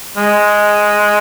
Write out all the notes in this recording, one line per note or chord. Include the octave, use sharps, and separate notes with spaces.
G#3